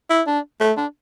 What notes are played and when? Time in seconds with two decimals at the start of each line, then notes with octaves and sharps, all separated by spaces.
0.10 E4
0.27 D4
0.61 A3
0.77 D4